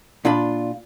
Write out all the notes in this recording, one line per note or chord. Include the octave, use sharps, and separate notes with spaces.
A#2 D4 F4 B5